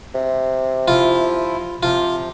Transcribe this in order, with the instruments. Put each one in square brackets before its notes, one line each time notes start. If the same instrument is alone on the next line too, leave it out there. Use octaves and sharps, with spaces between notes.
[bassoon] C3
[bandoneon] F3 E4 [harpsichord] F4
[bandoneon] C3 F3 [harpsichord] F4